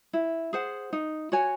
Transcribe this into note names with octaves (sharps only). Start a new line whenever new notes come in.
E4
G#4 C5 F#5
D#4
F#4 C#5 G#5